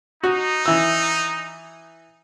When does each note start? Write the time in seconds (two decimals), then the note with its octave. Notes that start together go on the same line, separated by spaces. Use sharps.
0.24 D#4 F#4
0.66 E3 E6